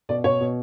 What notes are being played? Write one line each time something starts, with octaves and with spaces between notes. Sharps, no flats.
B2 D5
B2 C#5
B2